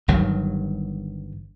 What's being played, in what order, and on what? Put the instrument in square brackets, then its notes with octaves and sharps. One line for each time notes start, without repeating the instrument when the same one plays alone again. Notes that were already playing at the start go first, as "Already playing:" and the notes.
[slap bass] G1 G2 D#3 F#3